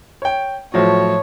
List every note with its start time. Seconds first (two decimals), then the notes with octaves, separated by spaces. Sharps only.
0.22 C#5 G5
0.74 A2 F3 F#3 C#5